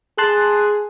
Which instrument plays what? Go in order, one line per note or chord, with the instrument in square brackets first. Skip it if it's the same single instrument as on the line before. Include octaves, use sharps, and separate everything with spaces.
[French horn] G#4 [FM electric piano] A5 C6 F#6